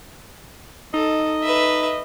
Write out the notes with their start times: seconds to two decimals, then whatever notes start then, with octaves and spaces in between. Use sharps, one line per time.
0.94 D#4 A4 D#5
1.43 B4 E5